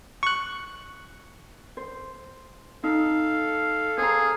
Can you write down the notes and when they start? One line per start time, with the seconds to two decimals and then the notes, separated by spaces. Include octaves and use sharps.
0.23 C#6 F#6
1.77 C5
2.84 D#4 A4 F5
3.98 G#4 C5 A#5